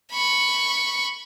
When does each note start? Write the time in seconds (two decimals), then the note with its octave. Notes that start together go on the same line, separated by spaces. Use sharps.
0.12 B5 C#6